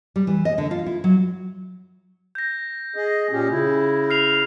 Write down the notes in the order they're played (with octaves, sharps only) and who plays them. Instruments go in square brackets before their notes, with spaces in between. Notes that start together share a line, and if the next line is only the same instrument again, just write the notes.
[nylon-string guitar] G3
E3
D#5
D3
F4
E4
F#3
[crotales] G6 A#6
[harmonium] G#4 D#5
A#2 C#4 G4
C#3 E4
[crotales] F6 C7 F7